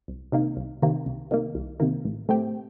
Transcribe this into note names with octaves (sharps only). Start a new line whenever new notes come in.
C2
C3 D#3 A#3
C2
C3 D#3 A#3
C2
C3 D#3 A#3
C2
C3 D#3 A#3
A1
A2 A3 C4 G4